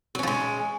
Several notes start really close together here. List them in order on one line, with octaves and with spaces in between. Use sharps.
F#3 C#4 F3 G#3